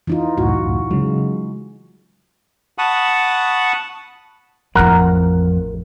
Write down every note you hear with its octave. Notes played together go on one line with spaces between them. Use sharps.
E3 D#4 F4
C#2 F#2 A2 F#4
C#3 F#3 G#3
F#5 A5 B5 C#6 D#6
A1 F2 E4 A#4 F#5